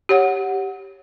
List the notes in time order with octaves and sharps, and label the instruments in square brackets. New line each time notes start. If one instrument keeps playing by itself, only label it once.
[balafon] G4 C#5 F#5